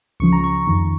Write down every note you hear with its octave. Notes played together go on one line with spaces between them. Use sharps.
C#2 C#3 F3 C#6
A#5
C#6
F2 D#3